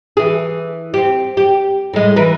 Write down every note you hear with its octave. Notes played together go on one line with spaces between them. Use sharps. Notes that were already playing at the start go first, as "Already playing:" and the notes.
E3 G#4
C4 G4
G4
A2 G#3
E3 A#4 B4